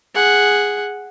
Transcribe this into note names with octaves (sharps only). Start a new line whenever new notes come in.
G#4 F#5